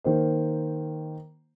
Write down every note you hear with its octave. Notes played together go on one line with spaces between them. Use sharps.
D#3 A#3 C5